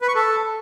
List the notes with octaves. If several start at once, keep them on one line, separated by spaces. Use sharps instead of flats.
B4
C#6
A4